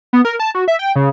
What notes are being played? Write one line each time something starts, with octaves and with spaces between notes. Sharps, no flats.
B3
A#4
A5
F#4
E5
G5
C#3